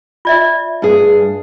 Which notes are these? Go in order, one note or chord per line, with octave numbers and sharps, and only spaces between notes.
F4 D5 E5
G2 G#4